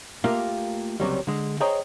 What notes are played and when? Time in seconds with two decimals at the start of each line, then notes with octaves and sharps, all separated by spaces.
0.24 A3 A#3 F4 G4 A#4 F5
1.00 C#2 C3 F#3 G3
1.27 D3 G#3
1.60 G#4 C5 C#5 D#5 G5 A#5